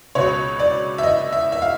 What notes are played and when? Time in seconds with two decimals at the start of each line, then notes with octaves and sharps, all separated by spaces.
0.15 C#2 B2 C#5
0.59 D5
0.98 E5
1.03 D#5
1.33 E5
1.52 E5
1.62 F5